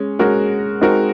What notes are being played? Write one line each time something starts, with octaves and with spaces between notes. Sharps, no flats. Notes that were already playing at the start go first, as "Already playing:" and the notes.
Already playing: G#3 C#4
G#3 C#4 F#4 A#4
G#3 C4 D#4 F#4 A#4